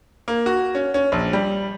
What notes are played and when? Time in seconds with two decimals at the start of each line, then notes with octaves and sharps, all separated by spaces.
0.28 A#3
0.46 F#4
0.75 C#4
0.94 C#4
1.12 A#1
1.33 G3